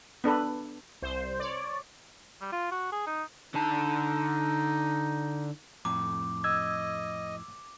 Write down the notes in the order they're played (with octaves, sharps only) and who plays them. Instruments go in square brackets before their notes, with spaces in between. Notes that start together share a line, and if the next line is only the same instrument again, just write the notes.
[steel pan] B3 D4 A4 B4
[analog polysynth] C2 C5
C#5 D5
[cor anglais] G3
F4
F#4
G#4
D#4
[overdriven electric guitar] D3 A5 [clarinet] D#4
[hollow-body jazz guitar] F2 A2 A#5 [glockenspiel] D6
[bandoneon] D#5 [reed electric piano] E6 G#6